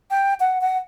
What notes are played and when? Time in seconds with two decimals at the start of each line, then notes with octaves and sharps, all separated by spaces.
0.10 G5
0.40 F#5
0.61 F#5